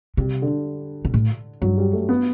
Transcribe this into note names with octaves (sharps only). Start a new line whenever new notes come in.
C3 G3
D3
B2
A2
G2 F#3
G3
A3
B3